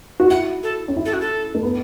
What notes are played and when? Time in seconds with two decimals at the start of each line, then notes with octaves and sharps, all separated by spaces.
0.20 F#4
0.30 E4 F#5
0.63 A4
0.88 C#4
0.97 E4
1.05 A4
1.13 F#4
1.21 A4
1.55 A3
1.63 B3